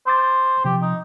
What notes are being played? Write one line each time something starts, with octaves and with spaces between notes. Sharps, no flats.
C5 C6 D6 A6
C3 F3 G4
D#4